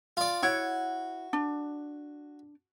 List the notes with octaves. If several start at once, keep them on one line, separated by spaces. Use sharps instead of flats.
F4 D5
E4 F#4 C#5 F#5
D4